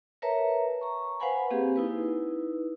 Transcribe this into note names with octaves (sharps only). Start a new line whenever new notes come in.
A#4 B4 C#5 E5 A5 A#5
A#5 C#6
B4 C5 F5 F#5 G#5 B5
A#3 C4 G4 G#4
D#4 E4 B4